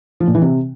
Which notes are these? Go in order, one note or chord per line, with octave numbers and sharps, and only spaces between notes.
F3
A#2
E3
C3